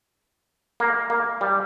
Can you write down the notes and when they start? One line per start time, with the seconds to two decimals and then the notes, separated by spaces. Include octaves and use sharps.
0.80 A#3
1.10 A#3
1.41 G3